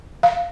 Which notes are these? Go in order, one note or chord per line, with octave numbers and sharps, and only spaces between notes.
F5